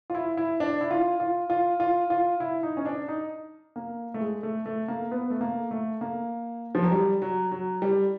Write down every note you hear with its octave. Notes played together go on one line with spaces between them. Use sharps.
F4
E4
E4
D4
E4
F4
F4
F4
F4
F4
E4
D#4
C#4
D4
D#4
A#3
A3
G#3
A3
A3
A#3
B3
A3
A#3
A3
A#3
F3
F#3
G3
F#3
F#3
G3